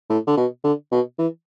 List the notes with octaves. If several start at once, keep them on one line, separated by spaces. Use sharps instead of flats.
A2
D3
B2
D3
B2
E3